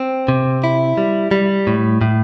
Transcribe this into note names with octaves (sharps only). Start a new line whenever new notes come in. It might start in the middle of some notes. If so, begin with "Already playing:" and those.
Already playing: C4
C3
E4
G3
G3
A2
A2